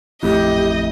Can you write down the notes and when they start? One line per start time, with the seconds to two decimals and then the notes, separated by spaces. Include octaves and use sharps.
0.23 A1 F2 A3 E4 G4 D#5